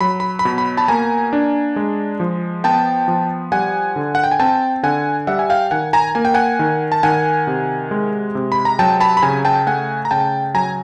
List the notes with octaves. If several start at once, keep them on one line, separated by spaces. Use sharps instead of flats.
F#3 B5
B5
B5
B2
B5
A5 B5
A#3 G#5 A#5
D4
G#3
F3
B3 G5 A5
F3
G3 F#5 G#5
D3
F#5
G5
G#5
C4 G5 A5
D3 F#5 G#5
G3 E5 F#5
G#5
F5 G5
D#3 F#5 G#5
G#5 A#5
A#3 G#5
G5
F#5 G#5
D#3
A5
D#3 F#5 G#5
C3
G#3
C3
B5
A#5
F#3 G5 A5
A5 B5
B5
C#3 G#5 A#5
G5 A5
A3 F#5 G#5
A#5
C#3 G5 A5
F#3 G#5 A#5